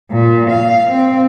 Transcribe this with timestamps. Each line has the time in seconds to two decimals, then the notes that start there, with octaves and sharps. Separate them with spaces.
0.11 A#2
0.50 F5
0.90 C4